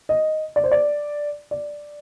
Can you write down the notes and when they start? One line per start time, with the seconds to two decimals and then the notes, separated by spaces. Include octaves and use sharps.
0.09 D#5
0.56 D5
0.64 C5
0.71 D5
1.51 D5